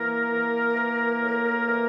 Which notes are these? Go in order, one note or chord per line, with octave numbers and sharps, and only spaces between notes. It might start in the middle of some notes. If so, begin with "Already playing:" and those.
Already playing: E3 A#3 A#4
E3
E3
A2
E3